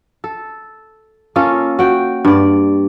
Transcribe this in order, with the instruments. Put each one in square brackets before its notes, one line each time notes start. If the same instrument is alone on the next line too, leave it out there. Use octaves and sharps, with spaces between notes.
[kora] A4
A#3 C#4 F4 A4
F#4 G5
G2 D5